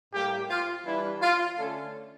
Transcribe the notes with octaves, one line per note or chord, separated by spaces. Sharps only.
A2 G3 A#3 G4
F4
E3 G3 D4 E4
F4
D3 A3 C#4 A4